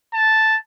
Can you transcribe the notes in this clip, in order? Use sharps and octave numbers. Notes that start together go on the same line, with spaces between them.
A5